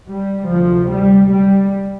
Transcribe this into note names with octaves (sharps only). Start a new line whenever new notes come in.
G3
D2 C3 F3
G3
G3